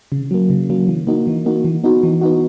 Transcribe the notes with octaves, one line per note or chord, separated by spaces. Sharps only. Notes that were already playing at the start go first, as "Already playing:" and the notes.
C#3
F#3 A#3
C#3
F#3 A#3
E3
A#3 D#4 F#4
E3
A#3 D#4 F#4
E3
B3 D#4 F#4
E3
B3 D#4 F#4